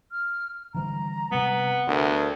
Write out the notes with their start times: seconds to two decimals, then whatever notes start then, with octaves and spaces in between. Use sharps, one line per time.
0.12 F6
0.74 D3 E3 G3 A#5
1.32 C3 G3 B3
1.88 D2 D4 A#4